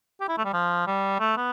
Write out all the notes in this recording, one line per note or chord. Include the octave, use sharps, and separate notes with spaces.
G4
E4
A3
G3
F3
G3
A3
B3